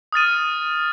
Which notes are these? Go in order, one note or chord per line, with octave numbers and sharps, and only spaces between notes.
D#6 F6 A6 D#7